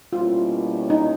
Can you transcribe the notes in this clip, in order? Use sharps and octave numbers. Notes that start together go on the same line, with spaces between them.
B2 G3 A#3 C#4 E4 F4
D#4